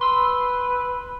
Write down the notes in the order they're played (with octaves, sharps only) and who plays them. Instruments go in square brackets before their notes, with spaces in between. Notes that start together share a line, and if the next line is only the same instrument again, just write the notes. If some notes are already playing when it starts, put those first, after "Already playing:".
[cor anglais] B4 [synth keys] C6 E6